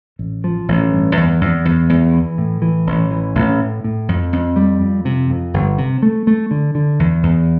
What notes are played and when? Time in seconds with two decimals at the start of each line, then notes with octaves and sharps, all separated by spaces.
0.19 A1
0.44 F3
0.68 A1
0.92 G2
1.17 E2
1.41 E2
1.65 E2
1.89 E2
2.14 E3
2.38 A2
2.62 E3
2.87 A1
3.11 E3
3.35 A1
3.59 A2
3.84 A2
4.09 F2
4.33 F2
4.56 G3
4.81 F2
5.05 C3
5.30 F2
5.54 G1
5.78 C3
6.03 A3
6.27 A3
6.51 D3
6.75 D3
6.99 E2
7.23 E2